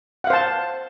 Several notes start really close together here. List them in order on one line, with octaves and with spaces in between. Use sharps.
F#5 F5 C5 A5